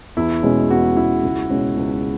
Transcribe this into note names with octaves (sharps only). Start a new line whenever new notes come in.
E2 E4
B2 G#3 C#4
E2 F#4
B2 G#3 C#4 E4
C#2
B2 G#3 C#4
C#2